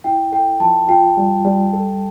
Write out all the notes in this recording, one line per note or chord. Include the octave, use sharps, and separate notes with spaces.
E4 G5
A4 G5
F3 A5
F4 G5
G3
G3
A4